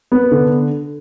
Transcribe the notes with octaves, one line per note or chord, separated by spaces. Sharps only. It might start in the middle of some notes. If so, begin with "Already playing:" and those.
B3
D3